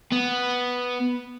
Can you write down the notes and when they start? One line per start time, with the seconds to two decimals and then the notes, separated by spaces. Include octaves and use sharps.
0.12 B3